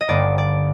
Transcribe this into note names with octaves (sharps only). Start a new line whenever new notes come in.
D#5
G1 G2 D3 G3 A#3 D5
D5